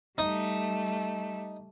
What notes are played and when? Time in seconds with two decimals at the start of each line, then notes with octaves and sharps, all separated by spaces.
0.18 G3 A3 D#4